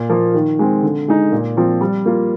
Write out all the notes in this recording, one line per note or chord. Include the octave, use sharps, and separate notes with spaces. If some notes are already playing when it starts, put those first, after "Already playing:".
Already playing: A#2
F3 A#3 F4
D#3
G#3 C4
D3
G#3 D#4
A#2
F3 C4 F4
G3
A#3 F4